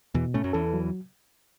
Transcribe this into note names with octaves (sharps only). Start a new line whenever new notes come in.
E2 B2 E3
A2 A3 C#4
F#2 F#3
E2 E3 A4
F#3